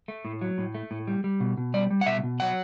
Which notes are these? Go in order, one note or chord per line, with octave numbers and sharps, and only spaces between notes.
A3
A2
F#3
A2
A3
A2
G3
G3
B2
B2
G3 D5
G3
F#5
B2 E5
B2
F#3 F#5